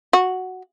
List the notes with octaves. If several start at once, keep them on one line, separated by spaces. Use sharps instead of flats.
F#4